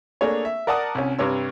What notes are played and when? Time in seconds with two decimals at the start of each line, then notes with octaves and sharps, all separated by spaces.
0.21 A3 A#3 D4 G#4 C#5
0.45 E5
0.67 A#4 D5 F#5 A5 D#6
0.95 C2 C#4
1.19 G2 C3 C#5 E6